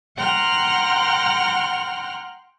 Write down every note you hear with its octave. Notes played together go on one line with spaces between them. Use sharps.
F#5 G5 A#5 C6 F6 F#6